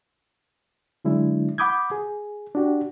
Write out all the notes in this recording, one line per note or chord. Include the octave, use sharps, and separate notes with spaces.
D3 F#3 G#3 D4 E4
F#5 B5 D6 D#6 G6 G#6
G#4
D4 F#4 G4